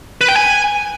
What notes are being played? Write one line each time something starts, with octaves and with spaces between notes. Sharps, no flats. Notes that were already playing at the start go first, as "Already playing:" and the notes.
B4
G5
G#5